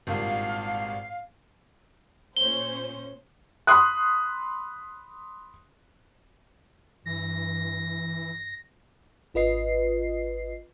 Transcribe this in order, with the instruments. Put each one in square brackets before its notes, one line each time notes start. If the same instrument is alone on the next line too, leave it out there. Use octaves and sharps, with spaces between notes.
[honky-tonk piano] G#1 G2 A#2 [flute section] F5
[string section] A#2 C#4 C5 [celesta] G7
[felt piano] B5 C6 D#6 F#6
[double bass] G2 [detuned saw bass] E3 [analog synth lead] A#6
[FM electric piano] G#1 F4 B4 D#5 C7